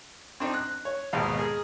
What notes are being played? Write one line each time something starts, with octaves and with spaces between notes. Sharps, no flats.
C4 D4 D#4
F#6
C#5
G#1 D#2 G#2 B2 F5
G#4 A#4